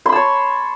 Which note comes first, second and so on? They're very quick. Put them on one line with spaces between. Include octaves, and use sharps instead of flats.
C6 B5 A5 C#5